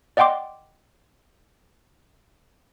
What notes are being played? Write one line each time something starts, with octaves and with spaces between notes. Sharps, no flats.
D5 D#5 F#5 G5 C6 D6